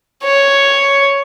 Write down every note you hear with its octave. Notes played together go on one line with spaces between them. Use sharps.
C#5